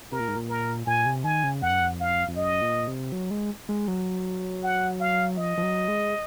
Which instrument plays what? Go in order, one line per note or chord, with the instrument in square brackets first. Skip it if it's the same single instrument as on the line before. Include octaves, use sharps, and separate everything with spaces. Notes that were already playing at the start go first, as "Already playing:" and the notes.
[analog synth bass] C3 [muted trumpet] A#4
[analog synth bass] A#2
G#2
A#2
[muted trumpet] A#4
[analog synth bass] A#2 [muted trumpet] G#5
[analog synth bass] C3
[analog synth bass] D#3 [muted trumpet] G#5
[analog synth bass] C#3
[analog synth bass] F2 [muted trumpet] F#5
[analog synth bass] F#2
F2
[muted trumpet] F5
[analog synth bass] F2
[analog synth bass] F#2 [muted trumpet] D#5
[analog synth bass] A#2
C3
F#3
G#3
G#3
F#3
[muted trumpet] F#5
F5
[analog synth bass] F3 [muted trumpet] D#5
[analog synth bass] F3
F#3
G#3